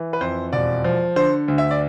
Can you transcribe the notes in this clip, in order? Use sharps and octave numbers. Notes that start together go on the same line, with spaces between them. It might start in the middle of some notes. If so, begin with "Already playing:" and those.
Already playing: E3
B4
F2 C5
E1 D5
F3
D3 C5
D2
E5
D5